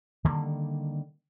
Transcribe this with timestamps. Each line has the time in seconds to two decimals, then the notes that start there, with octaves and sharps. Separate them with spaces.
0.25 D3 D#3 G3 A#3